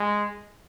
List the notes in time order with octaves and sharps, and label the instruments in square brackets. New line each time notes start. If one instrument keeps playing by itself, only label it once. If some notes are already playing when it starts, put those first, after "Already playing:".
Already playing: [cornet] G#3